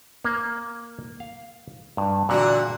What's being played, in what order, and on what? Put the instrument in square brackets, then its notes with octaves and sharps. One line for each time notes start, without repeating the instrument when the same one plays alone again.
[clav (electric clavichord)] A#3
F5
G2
[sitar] E2 D3 F#4 [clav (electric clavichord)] A#2